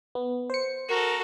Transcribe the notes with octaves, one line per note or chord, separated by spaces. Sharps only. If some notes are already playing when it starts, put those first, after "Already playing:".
B3
C5 C#7
F#4 A4 A#4